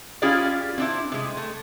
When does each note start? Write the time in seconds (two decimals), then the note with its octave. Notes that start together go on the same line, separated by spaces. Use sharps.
0.22 C#4 E4 F4 G4 G#4 D5
0.78 C4 D4 E4
1.12 C3 G#3
1.37 A3